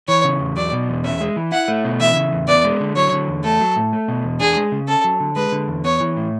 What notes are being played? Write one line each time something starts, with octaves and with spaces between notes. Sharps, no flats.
E3 C#5
C#3
E2
F#3 D5
B2
E2
C#4 E5
G#3
E3
E4 F#5
A3
B2
E3 E5
C#3
E2
B3 D5
G#3
D3
F#3 C#5
D3
E2
A3 A4
F#3
A2
A3
B2
E2
D4 G#4
G#3
C#3
C#4 A4
F#3
D3
G#3 B4
D3
E2
B3 C#5
E3
A2